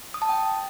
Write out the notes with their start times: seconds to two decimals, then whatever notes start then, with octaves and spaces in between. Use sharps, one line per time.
0.14 D#6
0.22 A5
0.29 G5